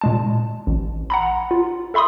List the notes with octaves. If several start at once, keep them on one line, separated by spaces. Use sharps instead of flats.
A#2 G#3 A5
A1
F#5 A#5 B5
F4
A4 E5 B5 C6 D#6